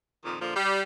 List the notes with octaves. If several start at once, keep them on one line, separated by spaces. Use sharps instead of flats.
F2 A#2 D#3
A#2 D3 F3
G3